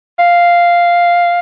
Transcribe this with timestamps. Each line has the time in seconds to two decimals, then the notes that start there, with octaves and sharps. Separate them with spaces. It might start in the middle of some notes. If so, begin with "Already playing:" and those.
0.19 F5